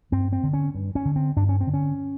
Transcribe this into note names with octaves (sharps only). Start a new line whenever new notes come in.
G2 C4
C4
D3
C#4
G2
C#4
D3
C4
G2 D4
C#4
C4
D3
C#4